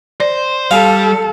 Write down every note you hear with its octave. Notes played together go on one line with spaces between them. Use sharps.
C5 D5
G3 A4 F5